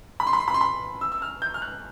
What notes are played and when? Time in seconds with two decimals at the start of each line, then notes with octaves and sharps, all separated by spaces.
0.20 B5
0.27 C6
0.33 B5
0.40 C6
0.48 B5
0.54 C6
0.61 B5
1.01 E6
1.12 E6
1.22 F6
1.42 G6
1.54 F6
1.62 F#6